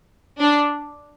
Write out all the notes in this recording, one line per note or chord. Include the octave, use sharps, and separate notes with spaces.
D4